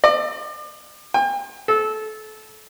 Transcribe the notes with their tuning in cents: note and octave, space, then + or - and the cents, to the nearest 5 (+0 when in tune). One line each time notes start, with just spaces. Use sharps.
D5 +35
G5 +40
A4 -25